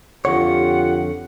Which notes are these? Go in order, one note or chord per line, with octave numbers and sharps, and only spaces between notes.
F2 D3 F4 G4 C#5 F#5